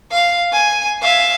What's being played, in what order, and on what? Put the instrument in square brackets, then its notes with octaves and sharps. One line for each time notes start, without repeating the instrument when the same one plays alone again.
[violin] F5
G#5
E5 F5